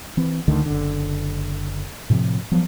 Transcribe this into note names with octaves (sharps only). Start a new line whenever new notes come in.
E3 C4
D2 D3 D#3 A3
F#1 D3
A2 C3 F3
F3 F#3 B3